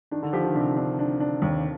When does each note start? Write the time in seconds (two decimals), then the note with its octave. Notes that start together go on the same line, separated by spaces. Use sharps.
0.11 D#3 D4
0.23 D3
0.33 F3 G4
0.44 D#3
0.55 C3 D4
0.77 D4
0.99 D4
1.20 D4
1.42 D#2